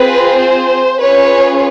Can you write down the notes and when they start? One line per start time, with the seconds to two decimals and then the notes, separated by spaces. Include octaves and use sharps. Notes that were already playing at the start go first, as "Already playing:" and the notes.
Already playing: C4 F4 G#4 B4
0.39 C5
0.99 C#4 F4 G#4 B4 C#5